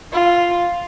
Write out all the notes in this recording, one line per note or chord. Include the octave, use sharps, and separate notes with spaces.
F4